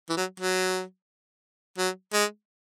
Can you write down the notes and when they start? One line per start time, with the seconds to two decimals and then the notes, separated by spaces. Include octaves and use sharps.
0.10 E3
0.17 F#3
0.40 F#3
1.78 F#3
2.14 G#3